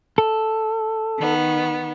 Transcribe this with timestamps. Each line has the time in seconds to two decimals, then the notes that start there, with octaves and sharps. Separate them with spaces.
0.18 A4
1.16 D#3 B3